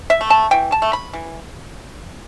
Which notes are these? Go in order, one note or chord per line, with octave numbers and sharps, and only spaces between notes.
E5
A3
A5
E3 G5
A5
A3
B5
E3